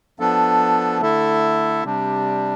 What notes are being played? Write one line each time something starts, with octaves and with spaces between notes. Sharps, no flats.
F3 B3 D4 A4
D3 A3 E4 A4
C3 G3 D4